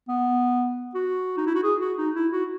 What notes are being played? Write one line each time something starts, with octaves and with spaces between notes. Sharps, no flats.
B3
F#4
D#4
E4
F#4
G#4
F#4
D#4
E4
F#4